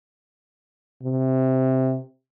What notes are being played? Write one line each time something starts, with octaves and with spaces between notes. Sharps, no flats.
C3